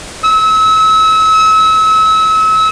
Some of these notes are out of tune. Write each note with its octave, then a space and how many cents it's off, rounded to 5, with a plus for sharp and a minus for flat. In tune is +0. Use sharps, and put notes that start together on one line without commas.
E6 -35